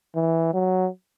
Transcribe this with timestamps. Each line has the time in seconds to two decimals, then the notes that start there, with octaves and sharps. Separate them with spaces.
0.16 E3
0.54 F#3